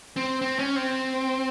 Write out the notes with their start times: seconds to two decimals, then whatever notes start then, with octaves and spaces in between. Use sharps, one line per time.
0.16 C4
0.42 C4
0.59 C#4
0.76 C4